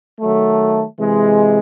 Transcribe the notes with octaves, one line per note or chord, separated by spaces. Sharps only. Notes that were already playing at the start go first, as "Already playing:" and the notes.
D#3 F#3 A3
C3 E3 G#3